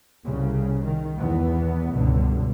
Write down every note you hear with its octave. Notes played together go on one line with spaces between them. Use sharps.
C2 C#3
D#3
E2 E3 B3
C#2 G2 B2 D3